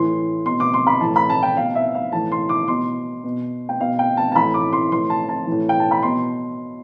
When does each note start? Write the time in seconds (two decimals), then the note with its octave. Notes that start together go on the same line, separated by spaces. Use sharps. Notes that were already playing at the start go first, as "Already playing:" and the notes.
Already playing: A2 E3 C6
0.45 B2 C6
0.60 D6
0.74 C6
0.87 B5
1.01 A2 E3 A5
1.16 B5
1.30 A5
1.43 G5
1.56 B2 F5
1.75 E5
1.95 F5
2.12 A2 E3 A5
2.32 C6
2.49 D6
2.68 B2 C6
3.24 B2
3.69 G5
3.80 B2 F5
3.99 G5
4.17 A5
4.32 A5
4.35 A2 E3 B5
4.54 D6
4.73 C6
4.92 A2 E3 C6
5.10 A5
5.29 A5
5.47 A2 E3
5.69 G5
5.80 A5
5.91 B5
6.02 B2 C6